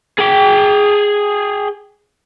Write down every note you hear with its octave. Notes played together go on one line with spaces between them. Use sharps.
G#4 G5